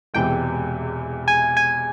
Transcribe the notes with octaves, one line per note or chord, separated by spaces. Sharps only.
E1 E2 C3 E3 G#3 G5
G#5
G#5